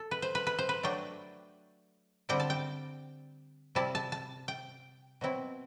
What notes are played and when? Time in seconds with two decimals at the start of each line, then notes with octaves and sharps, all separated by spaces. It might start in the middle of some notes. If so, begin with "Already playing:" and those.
Already playing: A4
0.11 B4
0.22 C5
0.35 B4
0.47 B4
0.59 C5
0.69 B4
0.83 F#3 A3 D4 G5
2.29 D3 G3 C4 E4 G5
2.40 A5
2.50 G5
3.75 C3 G3 C4 E4 A5
3.95 A5
4.12 A5
4.48 G5
5.21 B2 F#3 C4 E4